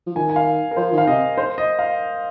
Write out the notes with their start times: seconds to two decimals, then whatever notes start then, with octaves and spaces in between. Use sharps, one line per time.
0.07 F3
0.16 D#3 G#5
0.30 G#5
0.36 F5
0.71 A#4
0.77 F3 C5
0.92 D#3
0.98 F5
1.07 C3 D#5
1.38 C5
1.58 D#5
1.79 F5